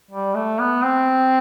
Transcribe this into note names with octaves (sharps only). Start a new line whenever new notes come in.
G3
A3
B3
C4